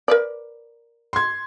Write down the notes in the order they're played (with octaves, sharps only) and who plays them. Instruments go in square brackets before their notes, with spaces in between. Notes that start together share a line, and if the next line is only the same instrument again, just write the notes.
[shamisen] A#4 B4 D5
[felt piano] C6 G#6